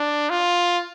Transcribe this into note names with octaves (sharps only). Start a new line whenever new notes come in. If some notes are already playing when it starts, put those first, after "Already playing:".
Already playing: D4
F4